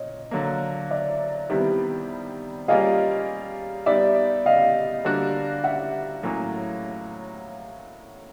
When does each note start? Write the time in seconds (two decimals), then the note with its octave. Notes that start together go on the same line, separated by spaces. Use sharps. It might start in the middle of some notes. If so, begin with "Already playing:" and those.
Already playing: A#2 C#5 D#5
0.31 D3 F#3 A#3
0.90 D5 E5
1.50 C3 D#3 G3 B3 E4
2.68 G3 A#3 C#4 F4 G#4 D#5 F5
3.86 G3 B3 D#4 G4 D5 E5
4.46 D#5 F5
5.04 D3 G3 A#3 D4 F#4
5.64 E5 F#5
6.23 A2 F#3 A#3 C#4